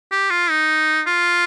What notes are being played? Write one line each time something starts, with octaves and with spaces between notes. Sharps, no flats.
G4
F4
D#4
F4